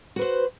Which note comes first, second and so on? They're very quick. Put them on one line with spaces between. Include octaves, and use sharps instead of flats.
F#4 B4 C5